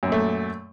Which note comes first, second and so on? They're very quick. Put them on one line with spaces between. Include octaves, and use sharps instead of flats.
F#2 A#2 A3